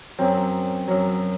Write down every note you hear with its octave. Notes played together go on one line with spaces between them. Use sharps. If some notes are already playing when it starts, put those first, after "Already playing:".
F#2 F#3 C4
F#2 F#3